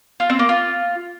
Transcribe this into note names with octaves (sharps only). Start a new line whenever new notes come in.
F4
C4
A#3
F4